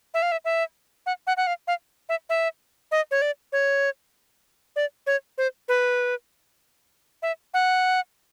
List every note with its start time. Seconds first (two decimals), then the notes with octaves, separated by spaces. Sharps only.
0.14 E5
0.22 F5
0.32 E5
0.45 E5
1.06 F#5
1.27 F#5
1.37 F#5
1.47 F5
1.67 F5
2.09 E5
2.30 E5
2.92 D#5
3.11 C#5
3.22 D5
3.52 C#5
4.76 D5
5.07 C#5
5.38 C5
5.68 B4
7.22 E5
7.54 F#5